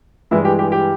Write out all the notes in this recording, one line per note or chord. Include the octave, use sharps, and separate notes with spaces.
G2 E3 G#3 E4
G4
G4
G4